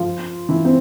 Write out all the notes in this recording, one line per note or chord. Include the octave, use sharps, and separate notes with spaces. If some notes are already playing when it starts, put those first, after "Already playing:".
Already playing: F3 F4
E3 E4
C4